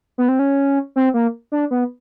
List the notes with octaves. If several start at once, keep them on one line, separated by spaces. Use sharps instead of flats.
B3
C4
C#4
C4
A#3
D4
B3